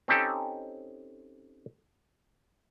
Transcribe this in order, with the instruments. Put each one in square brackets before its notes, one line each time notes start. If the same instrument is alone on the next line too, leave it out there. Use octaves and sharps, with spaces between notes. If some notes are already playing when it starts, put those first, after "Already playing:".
[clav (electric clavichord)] C4 C#4 D#4 G4 A4